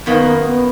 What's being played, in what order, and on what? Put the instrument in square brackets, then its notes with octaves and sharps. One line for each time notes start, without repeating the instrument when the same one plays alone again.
[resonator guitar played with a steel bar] F#2 D#3 A#3 [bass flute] B3
[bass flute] B3